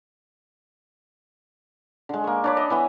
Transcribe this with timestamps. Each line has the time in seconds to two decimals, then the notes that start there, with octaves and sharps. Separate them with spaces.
2.09 D3 G#3
2.24 A#3 C#6
2.44 D4 C#5 B5
2.57 D#5
2.70 E3 B3 E5